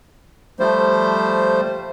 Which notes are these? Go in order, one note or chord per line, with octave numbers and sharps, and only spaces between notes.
F3 G3 A3 C5